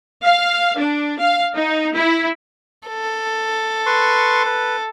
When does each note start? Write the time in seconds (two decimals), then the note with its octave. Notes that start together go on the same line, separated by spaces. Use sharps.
0.22 F5
0.78 D4
1.19 F5
1.54 D#4
1.95 E4
2.88 A4
3.86 B4 C6 C#6
4.46 B4